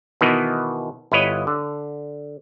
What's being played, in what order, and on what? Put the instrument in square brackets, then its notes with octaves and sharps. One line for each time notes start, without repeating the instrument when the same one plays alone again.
[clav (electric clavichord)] B2 D#3 E3 B3
G1 E4 B4 C#5 D#5
D3